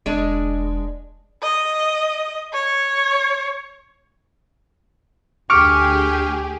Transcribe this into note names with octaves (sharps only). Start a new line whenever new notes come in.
E1 G#3 D4
D#5
C#5
D2 G4 G#4 C#6 D6 F6